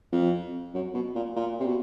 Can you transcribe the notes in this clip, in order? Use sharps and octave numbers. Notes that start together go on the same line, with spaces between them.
F2
F#2
B2
A#2
A#2
C3
B2